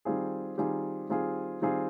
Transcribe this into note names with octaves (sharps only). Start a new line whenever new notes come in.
D#3 G3 C4 F4 G#4
D#3 G3 C4 F4 G#4
D#3 G3 C4 F4 G#4
D#3 G3 C4 F4 G#4